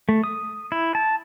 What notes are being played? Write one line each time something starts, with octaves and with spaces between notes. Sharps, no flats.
A3
D#6
E4
A5